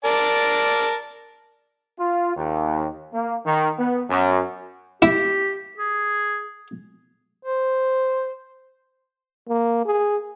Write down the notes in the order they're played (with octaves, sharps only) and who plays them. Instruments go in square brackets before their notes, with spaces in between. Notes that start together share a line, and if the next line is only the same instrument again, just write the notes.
[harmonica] A#4 D5 A5
[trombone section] F4
D#2
A#3
D#3
B3
F#2
[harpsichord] E4 [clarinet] G4
[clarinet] G#4
[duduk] C5
[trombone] A#3
G#4